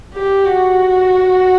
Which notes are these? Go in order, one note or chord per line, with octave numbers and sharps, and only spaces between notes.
G4
F#4